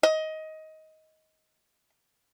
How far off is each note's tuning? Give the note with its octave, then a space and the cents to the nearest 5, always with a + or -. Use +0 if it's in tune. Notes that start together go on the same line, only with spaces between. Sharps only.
D#5 +15